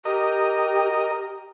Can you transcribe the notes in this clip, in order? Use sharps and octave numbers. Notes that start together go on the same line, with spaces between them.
G4 A#4 D#5